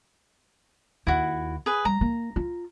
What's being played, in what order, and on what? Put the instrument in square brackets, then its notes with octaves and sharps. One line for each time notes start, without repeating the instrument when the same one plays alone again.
[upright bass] D#2 [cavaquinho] E4 F#4
[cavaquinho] G#4 B4
[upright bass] G3 [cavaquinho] A#5
[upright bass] A#3
F4